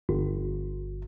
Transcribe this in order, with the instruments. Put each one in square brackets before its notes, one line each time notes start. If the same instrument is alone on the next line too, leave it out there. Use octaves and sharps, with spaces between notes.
[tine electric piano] G1